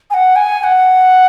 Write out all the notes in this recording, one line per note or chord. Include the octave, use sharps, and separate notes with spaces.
G#5
F#5
G#5
G#5
F#5